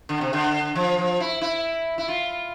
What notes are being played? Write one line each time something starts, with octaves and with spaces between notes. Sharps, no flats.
D3
C3
D3
F3
F3
E4
E4
E4
F4